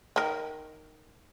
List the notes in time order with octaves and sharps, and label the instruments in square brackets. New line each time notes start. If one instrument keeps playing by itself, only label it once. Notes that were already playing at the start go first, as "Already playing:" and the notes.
[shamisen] D#3 A#4